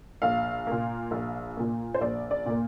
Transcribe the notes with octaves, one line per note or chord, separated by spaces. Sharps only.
A#1 F5
A#2 A#3
A#1
A#2 A#3
C5
A#1 D5
D5
A#2 A#3